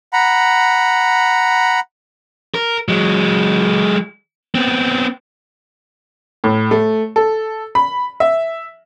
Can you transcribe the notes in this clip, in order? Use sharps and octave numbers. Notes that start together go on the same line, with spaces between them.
F#5 A#5 B5
A#4
F#3 G#3
B3 C4
A2
A3
A4
B5
E5